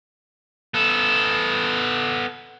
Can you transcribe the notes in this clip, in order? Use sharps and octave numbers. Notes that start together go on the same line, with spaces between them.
B3 A4